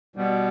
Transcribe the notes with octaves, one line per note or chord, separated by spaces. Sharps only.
B2 G3 B3